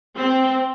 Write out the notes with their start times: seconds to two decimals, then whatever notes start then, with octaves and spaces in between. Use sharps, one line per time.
0.16 C4